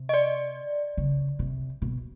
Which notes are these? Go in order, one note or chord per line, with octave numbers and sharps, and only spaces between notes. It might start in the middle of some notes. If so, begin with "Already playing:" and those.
Already playing: C3
D#5
D5
C#3
C3
B2